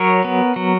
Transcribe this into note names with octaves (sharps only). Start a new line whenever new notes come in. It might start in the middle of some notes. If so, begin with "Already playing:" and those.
Already playing: F#3 A#4 C#5
B3
F#3